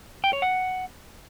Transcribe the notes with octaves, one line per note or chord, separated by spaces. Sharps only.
G5
C#5
F#5